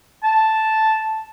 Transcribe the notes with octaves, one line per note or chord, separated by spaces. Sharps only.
A5